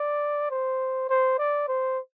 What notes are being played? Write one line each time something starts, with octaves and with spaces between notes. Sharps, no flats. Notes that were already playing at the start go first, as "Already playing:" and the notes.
Already playing: D5
C5
C5
D5
C5